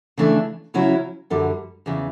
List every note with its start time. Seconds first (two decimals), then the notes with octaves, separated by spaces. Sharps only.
0.17 C#3 E3 A3 D4
0.74 C#3 F#3 C#4 E4
1.30 F#2 D3 G3
1.86 E2 C#3 E3